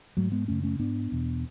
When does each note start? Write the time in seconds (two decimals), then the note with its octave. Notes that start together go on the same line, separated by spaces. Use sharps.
0.17 G#2 F#3 A3
0.32 G#3 B3
0.48 F#2 C#3 A3 C#4
0.63 A3 C#4
0.79 G#2 B3 D4
1.12 E2 B2